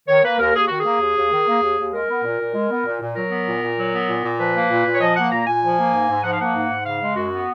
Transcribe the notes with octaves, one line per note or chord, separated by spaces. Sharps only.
D#3 C#5
A#3 B4
D#2 A#4
D#2 G#4
D#3 F#4
G#4
A#3
D#2
D#2
D#3
A#3
D#2
D#2
G#3 A#4
B3
A#2
A#2
G#3
B3
A#2
A#2
F#3 A#4
B3
A#2
A#2
F#3
B3
A#2
A#2
F3 B4
A#3
A#2
A#2
C#5
F3 D#5
A#3 F#5
A#2 A#5
A#2 G#5
F3
A#3
G#2
G#2
F3 F#5
F5
A#3 F#5
G#2
G#2
C#3 F5
G#3
F#2 F#4
B3